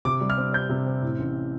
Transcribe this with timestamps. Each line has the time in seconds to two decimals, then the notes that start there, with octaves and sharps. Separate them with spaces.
0.05 C3 D6
0.21 G3
0.30 F6
0.38 C4
0.53 C4 G6
0.70 C3
0.86 C4
1.02 A2
1.19 A1